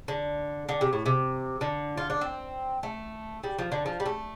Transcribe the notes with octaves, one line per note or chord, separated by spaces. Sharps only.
D3
D3
C3
A2
C3
D3
F4
D4
C4
A3
G3
F3
D3
F3
G3
A3